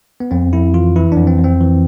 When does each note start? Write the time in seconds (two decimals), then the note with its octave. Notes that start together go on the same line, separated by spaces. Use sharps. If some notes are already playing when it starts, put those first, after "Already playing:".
0.20 B3
0.31 F2 C4
0.53 F2 E4
0.74 E3 F4
0.96 E3 E4
1.12 F2 D4
1.27 C4
1.39 F2
1.44 C4
1.61 E3